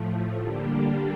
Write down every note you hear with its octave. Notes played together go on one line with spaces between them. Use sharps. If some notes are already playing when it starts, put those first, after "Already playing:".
Already playing: A2 F3 A3
D3 G3 A#3 D4 G4